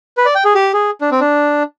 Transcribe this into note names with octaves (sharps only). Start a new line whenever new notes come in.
B4
D5
G5
G#4
G4
G#4
D4
C4
D4